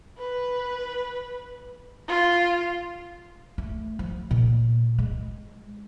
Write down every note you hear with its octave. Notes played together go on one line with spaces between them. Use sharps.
B4
F4
A3
F3
A#2
G#3